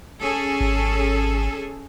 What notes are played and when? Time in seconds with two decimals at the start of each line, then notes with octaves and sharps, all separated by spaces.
0.21 C#4 G#4 A4
0.61 G#1